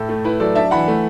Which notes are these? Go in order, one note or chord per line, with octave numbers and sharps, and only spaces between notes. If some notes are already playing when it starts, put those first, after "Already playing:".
Already playing: A2 A4
A3
E4 B4
F#3 A4 D5
D4 E5 A5
E3 F#5 B5
A3